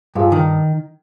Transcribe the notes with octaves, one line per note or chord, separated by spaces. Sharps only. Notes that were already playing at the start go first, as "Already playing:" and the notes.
G2 F4 G#4
D#3